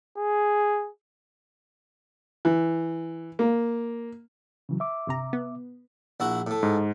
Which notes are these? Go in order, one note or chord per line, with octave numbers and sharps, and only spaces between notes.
G#4
E3
A#3
C#3 E3 F#3
E5 D6
G1 C3 A#5
B3
A#1 E4 F#4
A2 A3
G#2